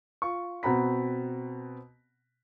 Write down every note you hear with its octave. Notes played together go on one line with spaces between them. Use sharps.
F4 C#6
B2 C4 F#5 A#5 B5 B6